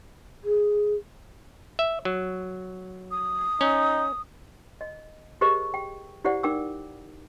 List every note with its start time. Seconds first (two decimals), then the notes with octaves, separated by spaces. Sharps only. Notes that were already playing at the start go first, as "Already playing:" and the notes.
0.44 G#4
1.79 E5
2.05 F#3
3.11 D#6
3.61 C#4 D#4
4.81 D#5
5.41 G4 G#4 A#4 C5 D#5 C#6
5.74 G5
6.24 E4 G4 C5 D5 F#5
6.43 D#4 A#4 G5 D6 E6